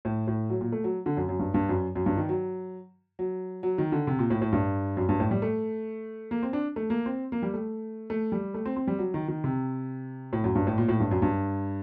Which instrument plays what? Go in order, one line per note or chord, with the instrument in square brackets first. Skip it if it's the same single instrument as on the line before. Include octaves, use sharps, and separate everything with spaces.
[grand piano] A2
A2
F#3
A#2
A3
F#3
D3
F#2
F#2
G2
G2
F#2
F#2
G2
D#3
F#3
F#3
F#3
D#3
D3
C3
A#2
A2
A2
G2
F#2
G2
A2
G3
A3
A#3
C4
D4
A3
A#3
C4
A#3
G3
A3
A3
G3
A3
C4
C4
G3
F#3
D#3
D#3
C3
A2
F#2
G2
A2
A#2
A2
G2
F#2
G2